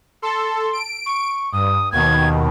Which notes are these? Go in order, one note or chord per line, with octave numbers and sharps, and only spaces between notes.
A4 C6
D7
C#6
G2 D#6
D#2 B2 D#3 G#6